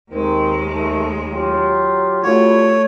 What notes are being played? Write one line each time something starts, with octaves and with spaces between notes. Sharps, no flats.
D#2 D#3 G#3 C4
D#3 A3
F#3 F4 G4
C2 A3 F4 F#4 C#5